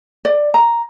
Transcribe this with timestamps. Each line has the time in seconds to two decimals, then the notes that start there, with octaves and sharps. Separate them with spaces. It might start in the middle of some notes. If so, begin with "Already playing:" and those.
0.25 D5
0.54 A#5